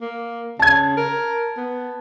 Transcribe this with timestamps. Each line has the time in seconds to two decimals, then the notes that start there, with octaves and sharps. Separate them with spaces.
0.01 A#3
0.59 C#3 A5 G#6
0.97 A#4
1.57 B3